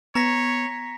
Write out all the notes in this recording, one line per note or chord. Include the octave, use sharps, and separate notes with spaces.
B3 C#5 A#5 A#6 B6